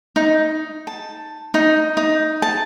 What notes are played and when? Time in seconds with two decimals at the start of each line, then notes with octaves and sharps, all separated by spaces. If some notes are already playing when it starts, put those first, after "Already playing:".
0.16 D#4
0.87 A5
1.54 D#4
1.97 D#4
2.42 A5